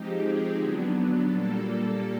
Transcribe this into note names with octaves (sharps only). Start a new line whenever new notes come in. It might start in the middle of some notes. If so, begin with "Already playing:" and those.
Already playing: F3 G#3 C4 D#4 G4
G#4
D3 F#3 B3 D4
A#2 G3 A#3 A4